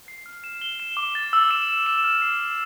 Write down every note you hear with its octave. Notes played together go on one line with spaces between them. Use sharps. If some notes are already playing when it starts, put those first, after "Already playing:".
C7
F6
E7
G7
E7
D6
A6
E6
E7
E7
E7
F6
C7
E7